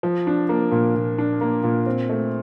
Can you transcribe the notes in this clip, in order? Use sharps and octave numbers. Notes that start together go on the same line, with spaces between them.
F3
D4
A#3
A#2
A#2
D4
A#3
A#2
C4
A3